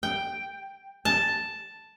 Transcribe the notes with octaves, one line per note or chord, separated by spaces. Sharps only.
G5
A5